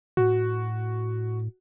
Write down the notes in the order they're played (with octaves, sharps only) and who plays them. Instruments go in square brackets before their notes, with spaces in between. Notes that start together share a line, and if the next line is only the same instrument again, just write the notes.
[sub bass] A2 [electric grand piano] F#4